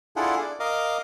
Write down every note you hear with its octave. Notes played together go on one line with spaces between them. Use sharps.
D4 E4 F4 G#4 A4 F#5
D5
A#4 D#5 F5 D6